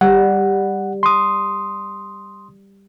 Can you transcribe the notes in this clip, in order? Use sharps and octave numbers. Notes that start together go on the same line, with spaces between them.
G3 F#5
C6 D#6